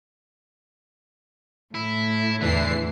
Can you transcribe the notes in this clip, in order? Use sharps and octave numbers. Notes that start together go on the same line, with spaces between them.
A2 E4
E2 D3 E3 C7